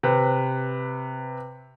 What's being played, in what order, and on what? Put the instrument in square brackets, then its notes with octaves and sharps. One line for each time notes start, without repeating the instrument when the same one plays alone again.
[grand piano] C3 B4